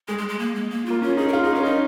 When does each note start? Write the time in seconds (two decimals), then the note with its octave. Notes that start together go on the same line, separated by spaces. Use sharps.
0.08 G#3 G#4
0.18 G#3
0.29 G#3
0.39 A#3
0.55 G#3
0.70 A#3
0.86 A#3 F4
1.02 C#4 F4
1.17 D#4 G#4
1.28 A#4
1.33 F4 G#4
1.43 D#4 G#4
1.53 C#4 A#4
1.63 D#4 D#5